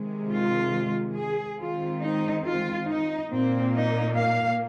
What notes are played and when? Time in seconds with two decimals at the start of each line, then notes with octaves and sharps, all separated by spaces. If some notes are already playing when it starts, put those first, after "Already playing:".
Already playing: C3 D#3 G#3
0.29 F4
1.15 G#4
1.59 D#3 G#3 C4 F4
2.02 D#4
2.45 F4
2.88 D#4
3.30 A#2 A#3 C4
3.74 D#4
4.17 F5